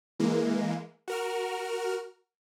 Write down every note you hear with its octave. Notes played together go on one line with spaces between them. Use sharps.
E3 G#3 A#3
F#4 A#4 F6